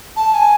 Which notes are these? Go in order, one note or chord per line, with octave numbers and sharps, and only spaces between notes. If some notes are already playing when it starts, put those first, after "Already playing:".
A5
G#5